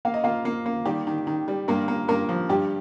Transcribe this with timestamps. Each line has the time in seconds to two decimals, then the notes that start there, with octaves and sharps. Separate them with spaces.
0.05 A#3 F5
0.14 D#5
0.24 A#3 F4 F5
0.45 A#3
0.66 A#3
0.86 D#3 G3 G4
1.07 D#3
1.27 D#3
1.48 G3
1.68 G2 A#3 A#4
1.88 A#3
2.08 G2 A#3 A#4
2.29 F3
2.49 G2 G3 G4